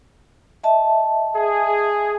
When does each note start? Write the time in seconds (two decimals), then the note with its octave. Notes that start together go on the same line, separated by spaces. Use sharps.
0.64 D#5 E5 A5
1.35 G#4